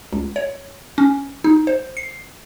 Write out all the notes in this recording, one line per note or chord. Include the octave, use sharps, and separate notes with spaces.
C#2
C#5
C#4
D#4
C5
C7